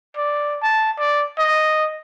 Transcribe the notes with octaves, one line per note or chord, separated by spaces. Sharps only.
D5
A5
D5
D#5